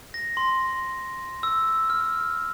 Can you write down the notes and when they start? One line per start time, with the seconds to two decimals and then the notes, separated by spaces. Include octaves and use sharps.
0.14 A#6
0.37 C6
1.43 E6
1.90 F6